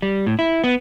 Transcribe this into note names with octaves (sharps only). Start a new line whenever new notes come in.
G3
A2
E4
B3